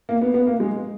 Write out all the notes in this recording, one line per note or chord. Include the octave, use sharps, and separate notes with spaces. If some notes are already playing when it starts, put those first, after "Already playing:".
A#3
B3
B3
A#3
G#3